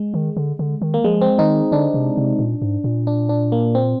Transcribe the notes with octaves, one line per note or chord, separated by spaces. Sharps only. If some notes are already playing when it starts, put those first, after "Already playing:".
Already playing: G#3
D#3
D3
D3
D#3
A#3
F3 G#3
C4
D#3 D#4
D3 D4
C3
C3
A#2
G#2
A#2
D4
D4
A#3
C4